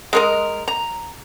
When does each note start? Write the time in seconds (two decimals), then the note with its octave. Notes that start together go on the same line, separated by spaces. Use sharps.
0.13 G#3 A#4 D#5
0.68 A#5